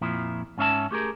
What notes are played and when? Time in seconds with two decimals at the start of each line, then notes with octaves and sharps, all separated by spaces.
0.01 F2 A#2 F3 E4
0.58 G#2 C#4 E5 A5
0.91 A3 G4 G#4 A#4